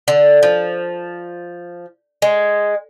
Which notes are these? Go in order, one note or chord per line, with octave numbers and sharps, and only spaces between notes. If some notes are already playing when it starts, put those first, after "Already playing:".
D3
F3
G#3